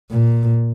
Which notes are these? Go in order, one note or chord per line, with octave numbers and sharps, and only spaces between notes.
A#2